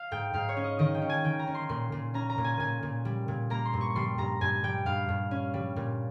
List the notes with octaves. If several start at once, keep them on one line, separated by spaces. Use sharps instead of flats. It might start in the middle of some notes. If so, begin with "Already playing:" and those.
Already playing: F5
G#2 G5
G#2 F5
C#5
C#4
D#5
D#3 D#5
G5
C#4
G#5
D#3 G5
A#5
C#4
C6
A#2 C6
A#2
C#4 A#5
A#5
A#2
G#5
A#2 G#5
A#2
G3
A#2
A#3 A#5
C6
G2
C#6
G3 C6
G2 A#5
G2 G#5
G3 G5
G2 F5
G2
C#4
G3
A#2